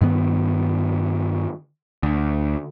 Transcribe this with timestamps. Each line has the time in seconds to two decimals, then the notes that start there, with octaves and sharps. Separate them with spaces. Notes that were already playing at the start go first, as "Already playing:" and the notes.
0.01 G2 D#3 B3
2.03 D2